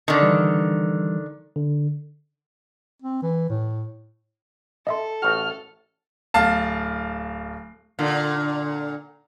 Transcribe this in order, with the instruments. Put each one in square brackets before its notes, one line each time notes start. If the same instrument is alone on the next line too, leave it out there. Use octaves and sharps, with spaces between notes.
[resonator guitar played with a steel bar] D3 D#3
[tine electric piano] E3 G3
D3
[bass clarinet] C4
E3
A2
[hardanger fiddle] A4 [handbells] D#5 E5 C6
[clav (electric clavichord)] A1 F#4 [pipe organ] F6
[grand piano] D1 F5 A5
[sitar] A#2 D3